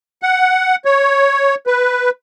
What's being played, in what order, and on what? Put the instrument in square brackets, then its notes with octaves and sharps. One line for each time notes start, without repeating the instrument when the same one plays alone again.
[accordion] F#5
C#5
B4